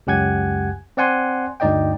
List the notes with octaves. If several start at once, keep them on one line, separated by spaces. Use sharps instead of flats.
C#2 F#2 G4 F#5 G#5 G#6
C4 D5 F#5 G#5 C6
D2 G2 D#4 D5 D#5 G5